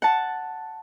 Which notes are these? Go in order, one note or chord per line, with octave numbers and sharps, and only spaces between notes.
F#5 A5